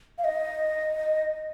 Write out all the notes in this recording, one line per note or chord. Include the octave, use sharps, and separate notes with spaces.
F5
D#5